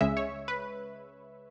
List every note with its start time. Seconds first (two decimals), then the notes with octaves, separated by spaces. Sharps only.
0.01 C#2 C#3 G#3 E5
0.17 C#5
0.48 B4